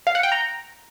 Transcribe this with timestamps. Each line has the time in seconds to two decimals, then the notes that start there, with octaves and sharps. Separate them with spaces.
0.07 F5
0.15 F#5
0.23 G5
0.32 A#5